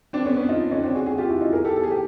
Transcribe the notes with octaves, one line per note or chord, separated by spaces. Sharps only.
C4 D4
B3 C#4
B3 C#4
D#4 F4
C#4 D#4
C4 D4
F#4 G#4
F#4 G#4
F4 G4
E4 F#4
D#4 F4
G#4 A#4
G4 A4
A4
G#4
G4